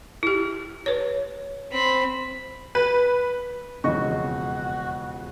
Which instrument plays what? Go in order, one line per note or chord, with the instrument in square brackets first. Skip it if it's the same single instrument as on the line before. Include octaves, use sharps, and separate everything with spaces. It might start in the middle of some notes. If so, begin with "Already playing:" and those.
[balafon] E4 G4
B4 C#5
[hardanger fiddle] C4 B5
[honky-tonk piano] B4
[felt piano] E1 F2 C#3 [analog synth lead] F#4 [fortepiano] D#5 C#6